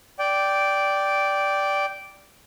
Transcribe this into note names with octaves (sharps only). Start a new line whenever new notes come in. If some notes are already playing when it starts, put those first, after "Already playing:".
D5 G5